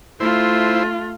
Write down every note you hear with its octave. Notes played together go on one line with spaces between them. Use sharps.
A3 E4 F4 C5